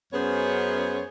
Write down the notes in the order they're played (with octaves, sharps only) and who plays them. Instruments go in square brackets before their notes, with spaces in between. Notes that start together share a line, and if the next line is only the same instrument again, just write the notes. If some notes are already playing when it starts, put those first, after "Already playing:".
[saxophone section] F#2 B3 C#4 G#4 C5 C#5